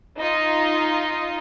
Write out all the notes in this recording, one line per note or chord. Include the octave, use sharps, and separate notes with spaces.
D#4 F4 D#5